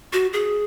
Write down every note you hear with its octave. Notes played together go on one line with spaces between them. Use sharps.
F#4
G#4